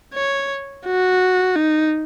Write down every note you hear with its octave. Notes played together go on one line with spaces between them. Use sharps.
C#5
F#4
D#4